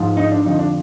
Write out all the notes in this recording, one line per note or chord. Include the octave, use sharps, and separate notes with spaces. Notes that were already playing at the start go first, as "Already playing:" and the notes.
Already playing: G#2 F3
D#4
D4
F2 D3 F3 D#4
D4